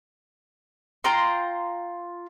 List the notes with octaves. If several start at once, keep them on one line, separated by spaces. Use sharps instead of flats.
F4 G5 A#5 C6